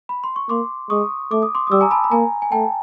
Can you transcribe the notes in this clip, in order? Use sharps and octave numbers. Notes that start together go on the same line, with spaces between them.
B5
C6
C#6
A#3 C6 D6
G#3 C#6 D#6
A3 D6
D#6
C6 D6
D#6
G3 D6 E6
G#5 A#5
A5 B5
B5
A#3 G#5 A#5
G#5
A3 G5 A5